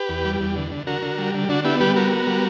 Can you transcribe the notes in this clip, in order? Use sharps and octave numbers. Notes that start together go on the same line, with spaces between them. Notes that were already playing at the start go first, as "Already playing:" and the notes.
Already playing: G4 B4
E2
G3
E2
D3
D3
D3 F#4 A#4
D3
G3
D3
D3 D4 F#4
B3 E4 G4
G3 G4 B4
B3 F#4 A#4
B3
G3